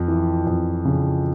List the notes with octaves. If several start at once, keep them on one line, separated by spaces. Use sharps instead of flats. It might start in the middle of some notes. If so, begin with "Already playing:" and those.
Already playing: F2
E3
F2
C#3